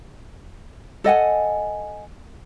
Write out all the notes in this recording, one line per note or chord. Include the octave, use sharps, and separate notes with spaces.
A4 D#5 F#5 G#5